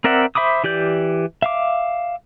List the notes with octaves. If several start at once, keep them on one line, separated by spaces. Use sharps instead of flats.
C4 A#4 D5 E5 F#5
C5 E5 B5 D6 D#6
E3 G4 D5 G6
E5 F5 D6